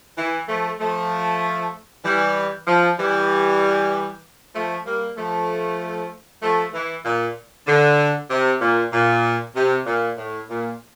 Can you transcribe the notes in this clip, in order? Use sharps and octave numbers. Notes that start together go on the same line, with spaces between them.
E3
F3 A3
F3 A3
E3 G3
F3
E3 G3
F3 A3
G3 A#3
F3 A3
F3 A3
E3
A#2
D3
C3
A#2
A#2
C3
A#2
A2
A#2